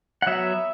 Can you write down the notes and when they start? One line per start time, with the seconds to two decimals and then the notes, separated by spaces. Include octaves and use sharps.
0.22 F#5
0.27 F#3 B3 E5